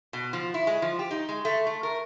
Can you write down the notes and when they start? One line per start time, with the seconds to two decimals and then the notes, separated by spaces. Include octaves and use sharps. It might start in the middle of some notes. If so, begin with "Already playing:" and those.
0.13 B2
0.33 F3
0.54 E4
0.67 G#3
0.82 F3
0.99 G4
1.11 D#4
1.29 G#3
1.45 A3
1.67 A3
1.83 A#4